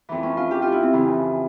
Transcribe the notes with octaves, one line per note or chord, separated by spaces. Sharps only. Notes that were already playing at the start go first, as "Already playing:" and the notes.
F2 E3
C#4
F4
G4
F4
E4
C4
F2 C#3 E3